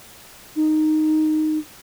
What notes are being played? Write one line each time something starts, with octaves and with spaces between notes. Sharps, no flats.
D#4